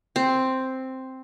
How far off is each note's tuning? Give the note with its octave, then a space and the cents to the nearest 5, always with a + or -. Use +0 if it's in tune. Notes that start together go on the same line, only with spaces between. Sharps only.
C4 +0